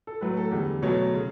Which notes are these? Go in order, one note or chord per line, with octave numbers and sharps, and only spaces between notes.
A4
A2 F#3 A3 B4
A4
E2 D3 G3
B2 F#3 A3 C#5
C#3